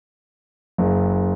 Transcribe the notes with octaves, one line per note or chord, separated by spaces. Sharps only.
F#1